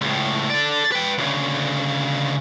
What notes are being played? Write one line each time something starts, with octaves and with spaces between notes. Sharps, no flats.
C#2 A2
A4 D5
B4 G5
D2 C#3